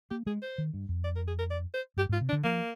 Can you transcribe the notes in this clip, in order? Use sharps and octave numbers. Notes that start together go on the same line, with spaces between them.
A#3 G4
G#3 G#4
C5
D#3
G2
F2
D5
A#4
G#4
A#4
D5
C5
G2 G4
G#2
F4
C3
D4
D3
F3 A#3